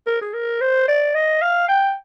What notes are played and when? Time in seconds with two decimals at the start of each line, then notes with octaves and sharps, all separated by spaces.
0.07 A#4
0.22 G#4
0.34 A#4
0.61 C5
0.88 D5
1.15 D#5
1.42 F5
1.69 G5